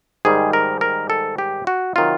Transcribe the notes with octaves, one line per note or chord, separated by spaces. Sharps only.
G#2 D#3 G3 G#4
A#4
A#4
A4
G4
F#4
C3 D#3 F#3 F4